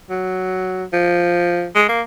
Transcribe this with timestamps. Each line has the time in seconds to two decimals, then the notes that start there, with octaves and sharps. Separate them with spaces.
0.10 F#3
0.93 F3
1.75 G#3
1.88 A#3